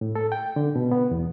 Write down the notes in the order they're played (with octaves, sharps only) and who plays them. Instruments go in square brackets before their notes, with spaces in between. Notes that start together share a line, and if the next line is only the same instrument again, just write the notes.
[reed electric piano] A2
A4
G5
D3
B2
B3
E2